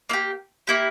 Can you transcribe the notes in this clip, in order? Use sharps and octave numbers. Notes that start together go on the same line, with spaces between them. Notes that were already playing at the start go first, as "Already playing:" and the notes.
A#3 E4 G4
A#3 E4 G4